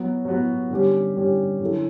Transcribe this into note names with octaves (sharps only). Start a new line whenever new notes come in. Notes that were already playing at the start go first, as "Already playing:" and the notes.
Already playing: F#3 B3 F#4
F#3 B3 F#4
D3 G3 C#4 G4
D3 G3 C#4 G4
D3 F#3 C#4 E4 A4